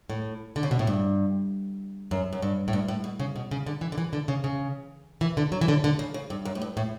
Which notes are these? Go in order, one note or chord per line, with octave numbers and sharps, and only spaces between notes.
A2
D3
C#3
B2
A2
G2
F#2
F#2
G2
A2
G2
A2
B2
C#3
B2
C#3
D3
E3
D3
E3
D3
C#3
C#3
E3
D3
F#3
E3
D3
D3
C#3
C#3
G2
F#2
A2
G2
A2